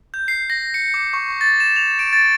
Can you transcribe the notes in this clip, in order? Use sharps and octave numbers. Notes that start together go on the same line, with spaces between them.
G6
C7
A#6
C#7
D6
C#6
A6
E7
F7
D7
A6